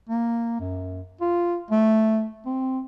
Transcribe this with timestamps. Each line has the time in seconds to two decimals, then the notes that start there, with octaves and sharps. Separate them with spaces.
0.09 A#3
0.60 F#2
1.21 F4
1.70 A3
2.45 C4